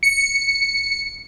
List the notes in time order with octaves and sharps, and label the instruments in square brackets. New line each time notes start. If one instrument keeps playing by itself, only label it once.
[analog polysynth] C#7